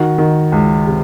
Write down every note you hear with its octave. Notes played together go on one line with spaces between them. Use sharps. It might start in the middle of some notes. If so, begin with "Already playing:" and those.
Already playing: D#3 F#4
D#3
C#2
C3